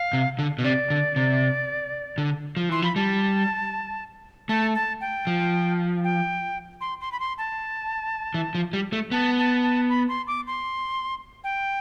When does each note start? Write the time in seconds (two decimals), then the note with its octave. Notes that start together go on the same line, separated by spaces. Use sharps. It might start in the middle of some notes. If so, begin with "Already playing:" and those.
Already playing: F5
0.13 C3
0.39 D3
0.59 B2
0.64 C3 D5
0.90 D3
1.16 C3
2.18 D3
2.57 F3
2.69 E3 C6
2.82 F3 B5
2.96 G3 A5
4.49 A3 A5
4.75 A5
5.01 G5
5.27 F3
6.04 G5
6.81 C6
7.01 C6
7.12 B5
7.20 C6
7.38 A5
8.34 E3
8.55 F3
8.73 G3
8.93 A3
9.11 B3 A5
9.38 A5
9.63 A5
9.90 B5
10.09 C6
10.27 D6
10.47 C6
11.44 G5